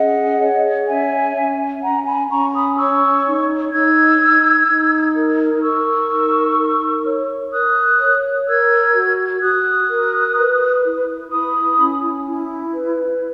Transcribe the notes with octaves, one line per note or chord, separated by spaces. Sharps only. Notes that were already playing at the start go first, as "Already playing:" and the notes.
Already playing: C#4 G#4 D#5 F#5
C#5
C#4 E5 G#5
C#4
C#4 F#5 A#5
G#5 B5
C#4 A#5 C#6
B5 D#6
C#5 C#6 E6
D#4
D#4 E6 G#6
D#4
D#4
A#4
A#4 C#6 E6
D#4
A#4
C#5
A#4 D#6 F#6
C#5
A#4 E6 G#6
F#4
F#4 D#6 F#6
A#4
B4
E4
E4 B5 D#6
C#4
E4
B4